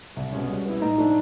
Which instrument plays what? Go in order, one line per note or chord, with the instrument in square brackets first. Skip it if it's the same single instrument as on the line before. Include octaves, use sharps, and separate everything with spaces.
[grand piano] C2
B2 G#3 C#4
G3
B3 E4
[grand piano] A2 [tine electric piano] D#4
[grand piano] F3 A3 D4